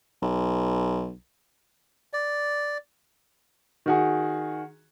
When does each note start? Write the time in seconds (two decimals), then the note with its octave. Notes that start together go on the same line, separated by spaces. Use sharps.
0.22 B1
2.13 D5
3.86 D#3 F#4 G#4